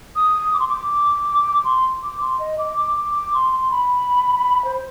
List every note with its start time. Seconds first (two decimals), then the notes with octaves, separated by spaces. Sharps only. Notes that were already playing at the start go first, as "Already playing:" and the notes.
0.16 D#6
0.53 D6
0.60 C6
0.68 D6
1.65 C6
2.03 D6
2.21 C6
2.39 D#5
2.58 D6
2.77 D6
2.96 D6
3.15 D6
3.34 C6
3.52 C6
3.71 B5
4.65 C5